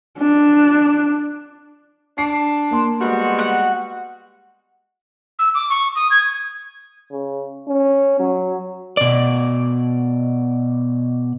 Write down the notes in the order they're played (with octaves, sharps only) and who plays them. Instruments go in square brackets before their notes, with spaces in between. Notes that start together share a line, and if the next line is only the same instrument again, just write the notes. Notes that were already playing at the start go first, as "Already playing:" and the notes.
[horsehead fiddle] D4
[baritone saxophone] D4 [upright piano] C7
[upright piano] A#3 C6
[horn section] G3 G#3 F#4 [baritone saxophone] B3
[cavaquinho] F#5
[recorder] E6
D6
C#6
D#6
G#6
[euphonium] C#3
C#4
F#3
[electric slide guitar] B2 D5